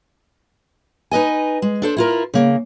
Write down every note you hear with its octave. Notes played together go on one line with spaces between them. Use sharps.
D#4 B4 D#5 G#5
G#3
D4 A4 C5
E4 F4 A#4
C#3 A#3